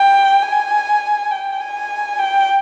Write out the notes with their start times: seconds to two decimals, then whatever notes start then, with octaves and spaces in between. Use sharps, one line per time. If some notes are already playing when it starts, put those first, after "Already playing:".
Already playing: G5
0.43 G#5
1.31 G5
1.60 G#5
2.19 G5